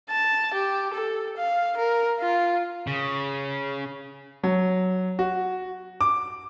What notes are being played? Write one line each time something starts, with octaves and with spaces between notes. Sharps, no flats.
A5
G4
A4
F5
A#4
F4
C#3
F#3
F#4
D6